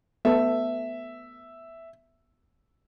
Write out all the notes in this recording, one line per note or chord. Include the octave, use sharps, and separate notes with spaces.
A3 B3 A4 E5